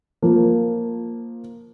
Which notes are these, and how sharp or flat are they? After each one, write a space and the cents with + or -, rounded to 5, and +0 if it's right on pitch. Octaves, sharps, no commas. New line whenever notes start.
F3 +5 A#3 +0